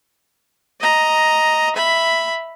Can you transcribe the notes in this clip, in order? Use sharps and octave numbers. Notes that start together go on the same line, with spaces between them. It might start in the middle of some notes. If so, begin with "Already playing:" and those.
D#5 A#5
E5 B5